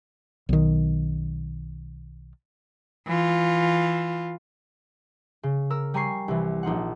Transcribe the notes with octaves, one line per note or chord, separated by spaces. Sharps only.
B1 D#3
E3 F4
C#3
A#4 E6
G3 G#5 A#5 C#6 C7
C2 E3
A#1 D#4 F4 F#5